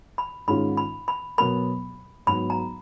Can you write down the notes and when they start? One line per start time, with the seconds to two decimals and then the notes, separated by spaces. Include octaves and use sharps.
0.18 B5
0.48 G#2 D#3 G#3 C#4 F4 B5
0.77 B5
1.08 B5
1.38 B2 F#3 B3 F#4 A#4 B5
2.27 G#2 F#3 B3 F#4 B5
2.50 A#5